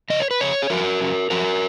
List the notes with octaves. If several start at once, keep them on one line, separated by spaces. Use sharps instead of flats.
F2 C#3 D#5
C#5
B4
F2 C#3 C#5
G#4
F#2 C#3 F3 F#4 A#4
F#2 C#3 F3
F#2 F3 F#4 A#4